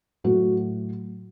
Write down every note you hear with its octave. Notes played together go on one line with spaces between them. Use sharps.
A2 F#3 A3 F#4